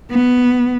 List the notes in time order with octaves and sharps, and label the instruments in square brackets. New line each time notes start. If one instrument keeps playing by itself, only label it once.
[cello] B3